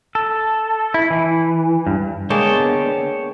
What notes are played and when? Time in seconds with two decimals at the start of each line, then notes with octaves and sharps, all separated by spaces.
0.15 A4
0.94 E4
1.10 E3
1.87 G2
2.30 D3 G#3 A#3 B3 C#5 G5 A5